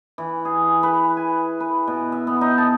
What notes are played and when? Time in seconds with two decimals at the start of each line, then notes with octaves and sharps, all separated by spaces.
0.18 E3
0.45 G#4
0.83 B4
1.17 G#5
1.60 B4
1.87 B2
2.12 E5
2.27 B3
2.41 D#4
2.58 A5